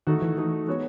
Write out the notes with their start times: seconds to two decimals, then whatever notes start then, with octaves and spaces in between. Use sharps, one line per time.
0.07 D#3 A3 D#4 F#4
0.22 E3
0.37 A3 D#4 F#4
0.67 G#3 B3 F#4 C#5